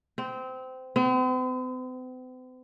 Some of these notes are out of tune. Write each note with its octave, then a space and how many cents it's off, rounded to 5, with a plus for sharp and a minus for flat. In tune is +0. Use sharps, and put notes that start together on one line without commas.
C4 -20
C4 -45